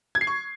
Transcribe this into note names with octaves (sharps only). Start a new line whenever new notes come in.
G#6
C7
C#6